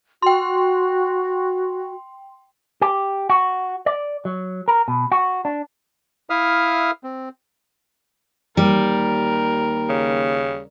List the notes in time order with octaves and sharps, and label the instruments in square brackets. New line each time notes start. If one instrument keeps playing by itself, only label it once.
[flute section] F#4 [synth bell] G5 C6
[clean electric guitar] G4
F#4
D5
F#3
A#4
B2
F#4
D4
[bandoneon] E4 E5 F5 D#6 F6
C4
[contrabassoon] D#2 [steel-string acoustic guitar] G3 [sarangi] A#4
[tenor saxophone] C#3